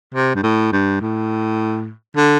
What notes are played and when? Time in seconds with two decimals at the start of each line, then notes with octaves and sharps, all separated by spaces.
0.14 C3
0.35 G2
0.43 A2
0.72 G2
1.01 A2
2.16 D3